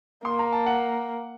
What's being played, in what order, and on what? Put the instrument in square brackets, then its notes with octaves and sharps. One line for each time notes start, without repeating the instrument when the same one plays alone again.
[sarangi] A#3 [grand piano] C6
[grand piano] A#5
A5
F#5